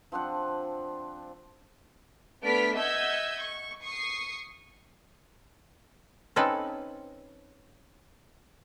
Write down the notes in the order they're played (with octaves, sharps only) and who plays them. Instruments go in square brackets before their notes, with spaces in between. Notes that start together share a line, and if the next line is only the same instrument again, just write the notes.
[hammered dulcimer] F3 C4 D4 F#5
[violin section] A3 B3 D4 F6 B6 D7
D#5 E5 F#5 E6 G6 G#6
C#6
C#6 D#6 C7
[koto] C4 C#4 D#4 A4 B4